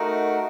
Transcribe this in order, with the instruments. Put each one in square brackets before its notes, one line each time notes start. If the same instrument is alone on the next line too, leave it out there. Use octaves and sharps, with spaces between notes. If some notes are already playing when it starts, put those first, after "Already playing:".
Already playing: [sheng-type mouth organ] A3 D#4 F#4 A#4 F#5